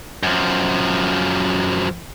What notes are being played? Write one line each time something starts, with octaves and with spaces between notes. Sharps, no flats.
F#2 F3